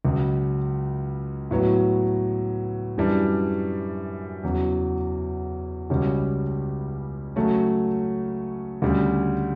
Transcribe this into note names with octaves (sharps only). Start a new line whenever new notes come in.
C#2 C#3 F#3
A2 F#3 B3
F#2 E3 G3 D4
E2 C#3 F#3
C#2 C#3 G3 C#4 F#4
C#3 F#3 A3 C#4
D2 C#3 G3